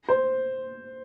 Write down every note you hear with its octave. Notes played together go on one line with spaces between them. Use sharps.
C5